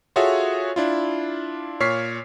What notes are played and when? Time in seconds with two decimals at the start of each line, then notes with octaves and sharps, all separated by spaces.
0.16 F4 F#4 G#4 A4 C#5 E5
0.76 D4 E4 F4
1.80 A#2 C#5 C#6 F6 B6 C7